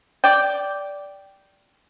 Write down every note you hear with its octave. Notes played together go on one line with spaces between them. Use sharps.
D5 G5